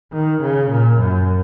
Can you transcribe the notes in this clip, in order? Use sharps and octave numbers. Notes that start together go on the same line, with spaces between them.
D#3
C#3
A#2
F#2